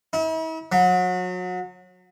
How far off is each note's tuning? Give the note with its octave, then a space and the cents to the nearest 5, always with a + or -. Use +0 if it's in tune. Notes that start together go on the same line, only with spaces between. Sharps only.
E4 -45
F#3 -30